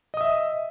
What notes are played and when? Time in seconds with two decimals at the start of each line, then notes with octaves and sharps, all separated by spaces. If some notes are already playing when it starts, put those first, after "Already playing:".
0.14 D#5
0.17 D#6
0.21 E5